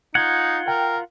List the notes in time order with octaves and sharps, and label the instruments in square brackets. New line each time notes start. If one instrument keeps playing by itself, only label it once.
[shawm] D#4 [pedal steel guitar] F4 F#5 [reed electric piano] G#6
[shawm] A#4 [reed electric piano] G5